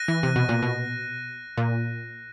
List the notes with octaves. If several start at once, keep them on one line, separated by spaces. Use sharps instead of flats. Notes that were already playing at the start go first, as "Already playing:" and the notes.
Already playing: F#6 A#6 D#7
E3
C3
B2
A#2
B2
A#2